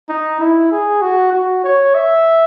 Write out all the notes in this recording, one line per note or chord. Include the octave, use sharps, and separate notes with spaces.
D#4
E4
G#4
F#4
F#4
C#5
E5